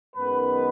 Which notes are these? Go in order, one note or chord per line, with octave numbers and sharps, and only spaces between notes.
F#2 D#3 G#3 B3 B4